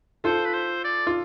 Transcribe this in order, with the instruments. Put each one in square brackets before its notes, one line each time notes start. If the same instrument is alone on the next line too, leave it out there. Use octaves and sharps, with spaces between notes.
[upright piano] F4 A4 [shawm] C5
[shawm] B4
C5
D5
[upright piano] F4